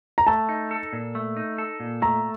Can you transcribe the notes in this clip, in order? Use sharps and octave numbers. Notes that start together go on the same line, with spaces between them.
A#5
A3 A5
D#4
A4
A#2
A3
D#4
A4
A#2
A3 A#5